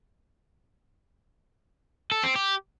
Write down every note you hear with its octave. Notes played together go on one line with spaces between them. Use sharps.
A4
C4
G4